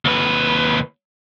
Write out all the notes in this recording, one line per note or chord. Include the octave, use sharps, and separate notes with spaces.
D#2 B4